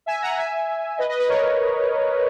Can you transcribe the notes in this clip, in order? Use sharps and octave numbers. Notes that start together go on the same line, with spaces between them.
E5 G#5
F#5 A#5
E5 G#5
B4 D#5
B4 D#5
B4 D#5
A#4 C#5